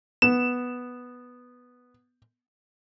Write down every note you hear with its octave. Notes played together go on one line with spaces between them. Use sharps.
B3 E7